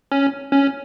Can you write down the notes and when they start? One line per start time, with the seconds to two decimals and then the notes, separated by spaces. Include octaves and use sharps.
0.12 C#4
0.52 C#4